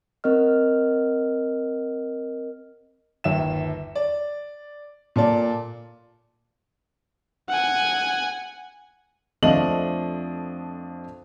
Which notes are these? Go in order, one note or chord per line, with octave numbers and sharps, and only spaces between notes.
C4 A#4 D#5 F6
G1 D#2 E5 E7
D5
A#2 A4 D5
F#5 G#5
F2 F3 A3 D4 D#5 F#7